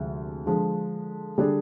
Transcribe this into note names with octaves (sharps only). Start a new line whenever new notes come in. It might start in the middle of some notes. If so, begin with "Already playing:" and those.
Already playing: D2 C3 F3 G#3
D3 F3 G#3
D3 G3 D4 G#4